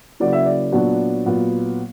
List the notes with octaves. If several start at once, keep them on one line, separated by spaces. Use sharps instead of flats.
C#3 F#3 A#3 E4 D5
E5
D5
A#2 F#3 B3 D4
A#2 F#3 B3